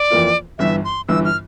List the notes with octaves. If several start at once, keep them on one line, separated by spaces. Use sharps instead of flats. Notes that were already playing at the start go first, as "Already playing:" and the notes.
Already playing: D5
F2 E3 A#3 F4
G1 G2 E3 E5
C6
G1 G2 E3 E6
F6